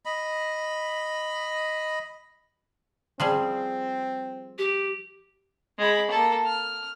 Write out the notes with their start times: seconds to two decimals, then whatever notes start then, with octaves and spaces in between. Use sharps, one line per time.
0.05 D#5 B5
3.20 F3 G3 C4 G#4
4.58 G4
5.78 G#3 B5
6.11 A#3 A4
6.47 F6